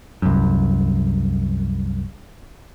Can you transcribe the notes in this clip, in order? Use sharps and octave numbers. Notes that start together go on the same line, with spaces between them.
C2 F#2